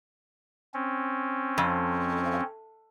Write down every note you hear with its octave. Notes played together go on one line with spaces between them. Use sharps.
C4 C#4
F2